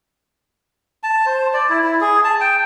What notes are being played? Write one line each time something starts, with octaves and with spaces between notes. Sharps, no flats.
A5
C5
D5
E4
E4
G#4
A5
G5